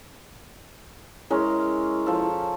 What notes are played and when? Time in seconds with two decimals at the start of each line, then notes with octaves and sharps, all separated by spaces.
1.30 G#3 C#4 E4 A#4
2.06 F3 A4